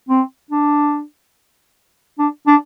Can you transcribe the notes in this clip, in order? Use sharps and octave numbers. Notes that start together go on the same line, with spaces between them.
C4
D4
D4
D4